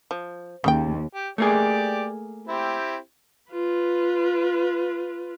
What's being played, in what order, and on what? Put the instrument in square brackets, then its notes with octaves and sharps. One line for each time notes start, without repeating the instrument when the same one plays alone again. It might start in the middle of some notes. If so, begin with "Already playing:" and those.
[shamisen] F3
[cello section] D#2 [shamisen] C#3 D#4 G5
[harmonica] G4
[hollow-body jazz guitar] A3 A#3 G#4 [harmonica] G4 D5
[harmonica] C4 E4 G4
[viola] F4 B4